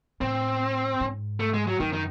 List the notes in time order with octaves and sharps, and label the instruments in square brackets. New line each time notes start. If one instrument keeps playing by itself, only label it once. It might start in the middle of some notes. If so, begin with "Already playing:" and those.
[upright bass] A2 [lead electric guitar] C4
[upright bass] G#2
[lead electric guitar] A3
G#3
F#3
[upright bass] F#2 [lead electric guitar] D#3
[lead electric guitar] D#3